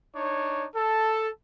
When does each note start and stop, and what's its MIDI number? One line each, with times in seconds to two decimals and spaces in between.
0.16 0.65 62
0.16 0.65 63
0.16 0.65 73
0.76 1.28 69